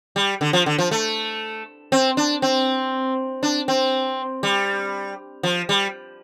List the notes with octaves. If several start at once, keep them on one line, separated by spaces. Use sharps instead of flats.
G3
D3
F3
D3
F3
A3
C4
D4
C4
D4
C4
G3
F3
G3